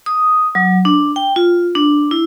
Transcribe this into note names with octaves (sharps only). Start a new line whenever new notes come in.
D#6
F#3
D4
G5
F4
D4
E4